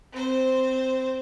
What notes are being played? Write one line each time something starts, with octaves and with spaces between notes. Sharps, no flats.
C4 C5